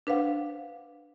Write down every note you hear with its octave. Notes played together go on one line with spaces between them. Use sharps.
D4 B4 C5 F5 F#5